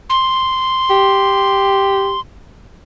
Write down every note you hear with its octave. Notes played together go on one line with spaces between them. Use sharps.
C6
G4